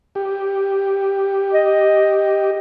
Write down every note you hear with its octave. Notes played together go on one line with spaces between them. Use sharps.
G4
D#5